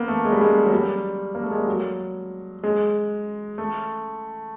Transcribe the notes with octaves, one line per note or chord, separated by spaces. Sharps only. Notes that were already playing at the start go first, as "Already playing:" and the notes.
Already playing: A#3 B3
A3
G#3
G3
G#3
F#3
G3
A#3
A3
G#3
G3
F#3
G#3
A3